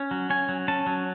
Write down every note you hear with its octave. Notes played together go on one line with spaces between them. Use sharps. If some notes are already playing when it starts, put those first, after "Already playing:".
Already playing: C#4
F#3
C#4 G#5
F#3
C#4 A5
F#3